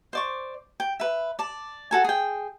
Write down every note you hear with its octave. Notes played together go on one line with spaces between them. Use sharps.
C5 D5 C#6
G5
B4 E5
D5 A5
F#4 A4 G#5
G#4 G5